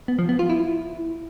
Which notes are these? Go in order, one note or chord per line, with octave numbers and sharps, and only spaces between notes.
B3
F3
B3
F4
E4